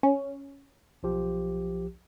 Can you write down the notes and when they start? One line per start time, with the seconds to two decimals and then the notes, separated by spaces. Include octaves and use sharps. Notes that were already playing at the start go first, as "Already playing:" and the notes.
0.03 C#4
1.03 B1 F3 G4